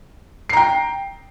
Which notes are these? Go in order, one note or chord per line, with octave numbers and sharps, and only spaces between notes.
G5 A#5 C7